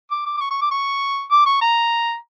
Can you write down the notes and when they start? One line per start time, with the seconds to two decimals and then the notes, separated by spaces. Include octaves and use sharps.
0.11 D6
0.26 D6
0.37 D6
0.41 C#6
0.51 C#6
0.61 D6
0.71 C#6
1.31 D6
1.46 C#6
1.61 A#5